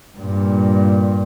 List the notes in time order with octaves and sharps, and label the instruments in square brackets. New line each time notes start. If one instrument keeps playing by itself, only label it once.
[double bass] G2 A#2